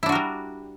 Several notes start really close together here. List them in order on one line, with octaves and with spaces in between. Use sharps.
E4 D4 F#4 A#4 G3